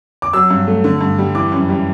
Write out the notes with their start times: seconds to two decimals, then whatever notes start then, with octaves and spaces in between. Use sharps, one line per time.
0.22 D6
0.33 F#3 E6
0.50 G2
0.67 A3
0.84 D3
1.01 G2
1.18 G3
1.35 E3 D6
1.52 F#2
1.69 G3